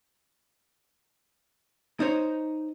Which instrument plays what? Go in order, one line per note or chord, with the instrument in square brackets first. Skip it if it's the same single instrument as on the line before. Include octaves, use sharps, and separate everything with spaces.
[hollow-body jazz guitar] D#4 C5 C#5